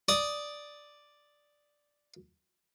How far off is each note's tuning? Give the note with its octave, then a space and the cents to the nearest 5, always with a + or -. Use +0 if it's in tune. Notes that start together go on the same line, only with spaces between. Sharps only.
D5 +0 D#6 +0